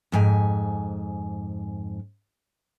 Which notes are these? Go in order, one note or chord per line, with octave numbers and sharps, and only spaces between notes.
F2 G#2 G#5